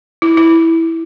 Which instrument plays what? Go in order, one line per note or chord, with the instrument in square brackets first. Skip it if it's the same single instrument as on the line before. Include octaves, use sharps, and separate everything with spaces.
[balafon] E4
E4